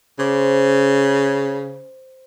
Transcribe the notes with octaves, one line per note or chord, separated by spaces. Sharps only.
C#3 C5 D6